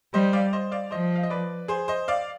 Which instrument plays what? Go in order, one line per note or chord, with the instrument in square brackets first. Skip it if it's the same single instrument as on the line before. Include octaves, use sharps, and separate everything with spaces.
[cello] G3 [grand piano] C5 D#5
[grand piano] D5 F5
C5 D#5
D5 F5
[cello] F3 [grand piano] C5 D#5
[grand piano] F5
D#5
B4 D5
G#4 C5
C5 D#5
D5 F5